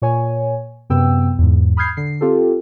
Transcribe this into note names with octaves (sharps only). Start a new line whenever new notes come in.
A#2 C#5 G#5
F#2 C3 B3 G5 E6
E2 G#2
B5 D#6 F6 G6 G#6 C7
D3 C7
C4 F4 G4 A4